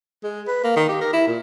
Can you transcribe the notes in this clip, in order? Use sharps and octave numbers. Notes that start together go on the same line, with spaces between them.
G#3
B4
A#3
D#3
G4
A#4
E4
A#2